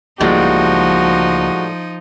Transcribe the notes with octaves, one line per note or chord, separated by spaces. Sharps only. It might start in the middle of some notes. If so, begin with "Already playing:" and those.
C#2 A2 F3 G3 G#3 A#3 D#4 F#4